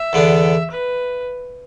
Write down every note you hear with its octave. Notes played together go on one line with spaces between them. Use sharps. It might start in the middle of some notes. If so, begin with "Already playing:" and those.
Already playing: E5
E2 D3 B3 D4
B4